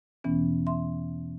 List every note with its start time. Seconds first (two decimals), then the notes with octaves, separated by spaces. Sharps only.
0.24 E2 B2 E3 B3 C#4
0.67 E5 C6